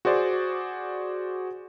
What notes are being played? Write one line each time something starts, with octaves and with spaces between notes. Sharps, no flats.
F#4 G#4 C5 D5